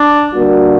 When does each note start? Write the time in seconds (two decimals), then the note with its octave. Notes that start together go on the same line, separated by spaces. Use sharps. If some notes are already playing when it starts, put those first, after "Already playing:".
Already playing: D4
0.32 D3 G3 A#3 D4 F#4